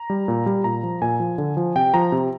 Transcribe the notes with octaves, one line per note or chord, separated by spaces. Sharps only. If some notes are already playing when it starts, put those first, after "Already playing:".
Already playing: A#5
G3
A#2
G3
A#2 A#5
F3
A#2 G#5
F3
D3
F3
C3 G5
F3 A#5
C3